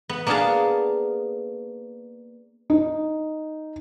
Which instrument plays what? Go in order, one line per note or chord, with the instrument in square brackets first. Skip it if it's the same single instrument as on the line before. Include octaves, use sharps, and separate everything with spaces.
[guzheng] B3
A#3 B3 D4 G#4 F5 A5
[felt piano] D#4